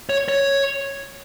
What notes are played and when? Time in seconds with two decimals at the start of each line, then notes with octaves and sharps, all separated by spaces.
0.09 C#5
0.28 C#5